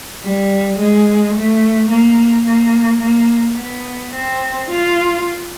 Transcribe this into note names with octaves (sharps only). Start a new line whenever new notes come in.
G3
G#3
A3
A#3
A#3
A#3
B3
C4
F4